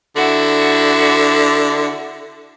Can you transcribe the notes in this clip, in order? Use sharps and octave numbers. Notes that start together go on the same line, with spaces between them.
D3 E4 F#4